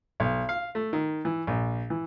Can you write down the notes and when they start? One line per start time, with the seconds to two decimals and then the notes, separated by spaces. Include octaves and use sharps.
0.20 B1
0.49 F5
0.75 A3
0.93 D#3
1.25 E3
1.47 A#1
1.90 E3